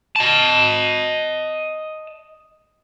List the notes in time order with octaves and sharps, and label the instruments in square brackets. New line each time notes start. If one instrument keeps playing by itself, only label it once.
[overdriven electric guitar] D#5 A5